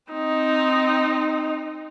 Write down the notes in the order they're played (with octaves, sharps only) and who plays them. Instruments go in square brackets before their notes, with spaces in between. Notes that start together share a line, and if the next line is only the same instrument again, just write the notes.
[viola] C4 D#4